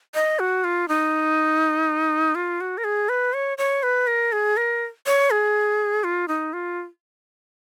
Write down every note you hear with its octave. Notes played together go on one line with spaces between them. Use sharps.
D#5
F#4
F4
D#4
F4
F#4
A#4
G#4
B4
C#5
C#5
B4
A#4
G#4
A#4
C#5
G#4
F4
D#4
F4